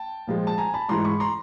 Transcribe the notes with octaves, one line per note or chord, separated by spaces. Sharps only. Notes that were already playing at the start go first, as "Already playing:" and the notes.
Already playing: G5 A5
A#2 F3 G#3
A5
G#5 A#5
A5 B5
G#2 E3 G#3 A#5 C6
B5 C#6
A#5 C6